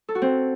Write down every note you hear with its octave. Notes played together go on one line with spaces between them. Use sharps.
A4
F#4
C4